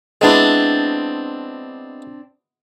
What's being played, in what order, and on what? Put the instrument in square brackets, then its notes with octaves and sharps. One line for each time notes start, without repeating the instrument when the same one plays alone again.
[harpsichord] G#3 B3 E4 [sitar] C4 D4